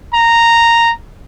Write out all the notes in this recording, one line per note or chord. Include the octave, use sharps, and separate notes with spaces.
A#5